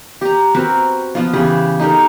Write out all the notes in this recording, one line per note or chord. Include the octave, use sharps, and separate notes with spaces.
G4 A#5
C4 F#4 A#4 B4
F3 B3 F4
C#3 E3 G4 B4
D#4 G4 A4 A#4